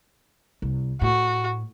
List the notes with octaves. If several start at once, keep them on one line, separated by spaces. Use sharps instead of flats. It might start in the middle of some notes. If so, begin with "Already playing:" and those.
C2
A2 F#4